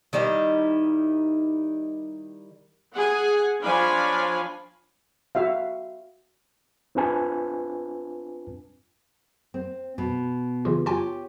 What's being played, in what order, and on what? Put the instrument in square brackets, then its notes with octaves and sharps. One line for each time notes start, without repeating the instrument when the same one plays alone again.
[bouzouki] D#3 G3 D#4 E4
[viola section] G#4 F#5 G#5
F3 D4 C#5 F5 G#5 B5
[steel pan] F#4 E5 F5
[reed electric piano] C4 D4 F4 B4 G#5 A5
[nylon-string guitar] C4
B2
[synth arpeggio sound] C#3 E3 F4
[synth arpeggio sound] F4 G#5 [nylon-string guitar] G4 C#5